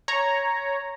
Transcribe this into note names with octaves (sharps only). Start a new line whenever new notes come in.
C#5 A#5